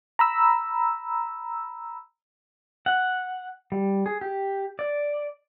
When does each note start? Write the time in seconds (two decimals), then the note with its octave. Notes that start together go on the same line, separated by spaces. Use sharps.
0.19 A#5 B5 E6
2.86 F#5
3.72 G3
4.06 G#4
4.21 G4
4.79 D5